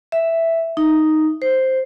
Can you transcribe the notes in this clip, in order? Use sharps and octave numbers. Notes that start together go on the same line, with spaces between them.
E5
D#4
C5